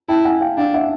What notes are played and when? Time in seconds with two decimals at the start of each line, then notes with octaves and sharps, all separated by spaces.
0.09 E4 G5 A5
0.25 F#5 G#5
0.41 F5 G5
0.58 D4 F5 G5
0.74 E5 F#5